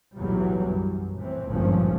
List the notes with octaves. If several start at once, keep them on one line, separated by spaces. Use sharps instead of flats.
B1 E2 A2 E3 F#3 G3
F#2
A2 E3 C4
G#1 D2 G2 A#2 F3 C#4